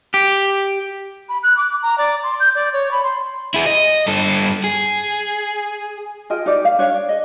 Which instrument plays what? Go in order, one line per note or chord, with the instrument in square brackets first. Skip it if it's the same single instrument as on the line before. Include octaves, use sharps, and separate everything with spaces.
[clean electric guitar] G4
[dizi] B5
F#6
D6
A#5
D5
C6
G6
D5
C#5
B5
C6
[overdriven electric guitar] E4 G#4
D#5
G2 A4
G#4
[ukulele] F4 G#4 D#5 G5
D#4 G4 D5
F5
D4 C#5 E5 F5
D5
G#4 D#5